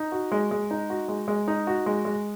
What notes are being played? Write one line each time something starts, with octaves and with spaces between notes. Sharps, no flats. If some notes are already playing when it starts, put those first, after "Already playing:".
Already playing: D#4
F#4
G#3
G#3
D#4
F#4
G#3
G#3
D#4
F#4
G#3
G#3